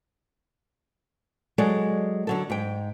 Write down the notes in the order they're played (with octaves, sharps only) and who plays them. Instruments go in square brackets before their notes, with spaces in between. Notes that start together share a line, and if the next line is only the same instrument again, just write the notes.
[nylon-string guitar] F#3 G#3 A4 D5
D3 F#3 A4
G#2 G5